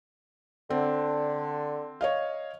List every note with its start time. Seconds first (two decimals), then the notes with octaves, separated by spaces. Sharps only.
0.70 D3 C4
2.01 C#5 D#5 F5